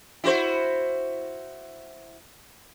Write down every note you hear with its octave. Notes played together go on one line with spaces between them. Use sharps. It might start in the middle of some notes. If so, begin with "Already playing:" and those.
E4 F#4 C5